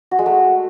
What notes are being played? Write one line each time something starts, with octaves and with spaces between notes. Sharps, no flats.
F#4
G#3
A3